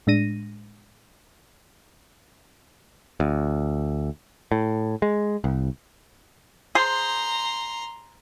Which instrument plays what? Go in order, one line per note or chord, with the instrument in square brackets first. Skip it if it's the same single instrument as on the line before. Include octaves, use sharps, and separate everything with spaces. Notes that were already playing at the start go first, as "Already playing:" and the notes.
[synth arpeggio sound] A2 G#3 D4 A#6 D#7
[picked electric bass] D2
A2
G#3
C2
[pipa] G#4 C5 [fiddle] A#5 C6